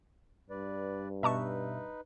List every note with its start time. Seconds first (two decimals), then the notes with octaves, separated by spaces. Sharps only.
0.50 G2 B4 D5
1.23 B2 D#4 B4 D#5 E5 A5 C#6